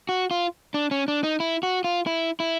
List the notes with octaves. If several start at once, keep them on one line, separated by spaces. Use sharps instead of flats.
F#4
F4
D4
C#4
D4
D#4
E4
F#4
F4
E4
E4